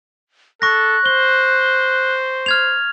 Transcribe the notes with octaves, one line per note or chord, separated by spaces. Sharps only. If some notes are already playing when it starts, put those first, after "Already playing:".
A4 C#6 F#6 A#6
C5 G7
F6 G#6 F7